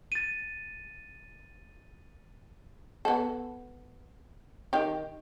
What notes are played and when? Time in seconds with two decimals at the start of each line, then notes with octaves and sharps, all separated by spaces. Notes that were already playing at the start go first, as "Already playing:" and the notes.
0.12 A6 D#7
3.05 B3 A4
4.73 D#3 G4